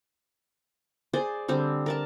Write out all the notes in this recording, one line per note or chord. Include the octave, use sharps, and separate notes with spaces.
G#4 C5 D5
D3 G3 C4
A#4 D5 A5